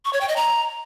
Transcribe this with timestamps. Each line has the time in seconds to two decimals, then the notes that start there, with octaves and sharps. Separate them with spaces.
0.05 C#6
0.13 C#5
0.21 G5
0.29 D#5
0.36 A#5